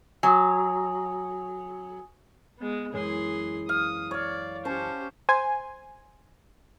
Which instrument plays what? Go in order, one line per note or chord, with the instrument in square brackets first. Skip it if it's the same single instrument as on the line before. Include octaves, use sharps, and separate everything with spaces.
[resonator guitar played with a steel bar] F#3 [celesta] G#5 D#6
[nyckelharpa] G#3 B3
[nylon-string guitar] F#2 E3 G#3 [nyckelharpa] G#4 C6
[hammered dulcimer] F5 [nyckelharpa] D#6
[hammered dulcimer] C#5 F5 [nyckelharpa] D5
[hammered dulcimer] C#4 C#5 A5 [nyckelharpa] G4 C5
[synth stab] C5 G#5